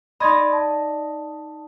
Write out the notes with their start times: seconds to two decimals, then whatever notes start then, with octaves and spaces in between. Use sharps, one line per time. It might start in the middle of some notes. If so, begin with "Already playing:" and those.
0.20 D#4 D5 D#5 B5 C6 G#6
0.53 A5